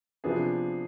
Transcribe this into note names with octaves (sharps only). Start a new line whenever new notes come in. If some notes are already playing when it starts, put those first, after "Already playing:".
C3 F3 B3 D4 G#4